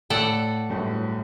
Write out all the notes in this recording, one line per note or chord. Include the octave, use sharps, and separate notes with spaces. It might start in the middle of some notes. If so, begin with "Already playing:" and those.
A2 A4 D5 F#5
D1 G1 A2